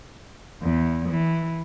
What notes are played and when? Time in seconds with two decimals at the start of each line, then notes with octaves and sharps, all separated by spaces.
0.61 E2
1.07 E3